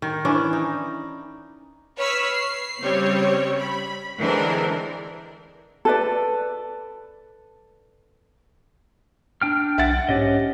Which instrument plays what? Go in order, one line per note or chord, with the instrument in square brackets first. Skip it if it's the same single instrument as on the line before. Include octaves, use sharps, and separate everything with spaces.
[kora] D#3
E3 C#4 D4
D#4
[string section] B4 C#5 E6 F6 B6
C7
C#3 G3 C4 C#5
B5
D3 E3 G#3 C4 D4 A#4
[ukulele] A4 B4 D5
[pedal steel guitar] D4 G5 F6
[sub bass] B1 [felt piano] E5 F#5 A6
[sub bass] G#2 [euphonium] C#4 [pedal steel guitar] G4 D#5